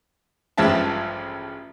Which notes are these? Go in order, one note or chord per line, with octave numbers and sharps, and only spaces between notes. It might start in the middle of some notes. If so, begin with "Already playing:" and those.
A1 G2 F3 G#3 E5 A5